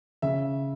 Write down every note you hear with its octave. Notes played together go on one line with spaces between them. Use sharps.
C#3 E5